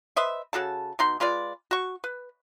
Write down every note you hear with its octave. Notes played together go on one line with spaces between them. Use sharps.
B4 C5 D#5 E5
C#3 F#4 A4 A5
B2 D#4 C6
G#3 F4 B4 D5
F#4 C#6
B4